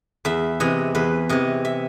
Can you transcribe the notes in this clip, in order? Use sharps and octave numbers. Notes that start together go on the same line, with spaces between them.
E2 E5
C3 E3 D#5
E2 B4
C3 E3 D#5
E5